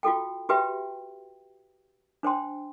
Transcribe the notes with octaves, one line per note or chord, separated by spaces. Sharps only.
F4 F#4 A4 G5
F#4 G4 B4 E5 G5
D4 C5 G5 C6